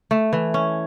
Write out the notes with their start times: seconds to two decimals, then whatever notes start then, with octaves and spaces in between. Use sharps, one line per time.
0.11 A3
0.33 E3
0.54 C#4